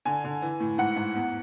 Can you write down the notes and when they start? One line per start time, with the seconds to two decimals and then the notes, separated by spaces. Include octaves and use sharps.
0.05 D3 G#5
0.24 D3
0.42 E3
0.60 A2
0.78 G#2 F#5
0.96 G#2
1.15 E2